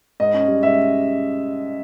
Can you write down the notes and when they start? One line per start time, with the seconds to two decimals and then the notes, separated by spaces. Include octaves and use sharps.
0.20 G#2 D#5
0.34 C#4
0.48 G3
0.63 G#2 E5